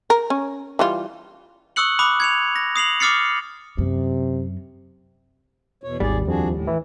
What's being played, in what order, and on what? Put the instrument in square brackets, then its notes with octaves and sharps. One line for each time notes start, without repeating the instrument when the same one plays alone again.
[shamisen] A#4
C#4
E3 G3 F4
[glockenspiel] C#6 D#6 E6 F#6 C#7 F#7
B5 D6 D#6 F#6
G#6 C#7 F7
A#6
D#6 C7 F7 F#7
D6 D#6 F6 A6 C7 C#7
[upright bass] F#2 [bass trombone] C3
[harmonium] E2 B2 C#5
[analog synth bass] G#1 [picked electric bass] D#2 G3 [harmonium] G#4 D5
[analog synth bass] F2 [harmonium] D4 F#4 G#4
[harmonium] A2
[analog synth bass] E3